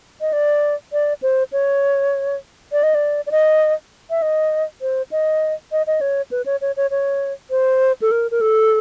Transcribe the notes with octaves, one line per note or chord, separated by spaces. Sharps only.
D#5
D5
D5
C5
C#5
D5
D#5
D5
D5
D#5
E5
D#5
C5
D#5
D#5
D#5
C#5
B4
C#5
C#5
C#5
C#5
C5
A4
A#4
A#4
A4